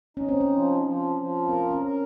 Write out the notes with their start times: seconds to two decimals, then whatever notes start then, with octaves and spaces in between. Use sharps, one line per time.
0.17 C#4 D#4
0.29 C4
0.41 C#4
0.50 F3
0.83 F3
1.16 F3
1.48 C4 A#4
1.71 C#4
1.82 A#4